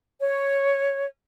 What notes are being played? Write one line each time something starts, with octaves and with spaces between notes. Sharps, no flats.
C#5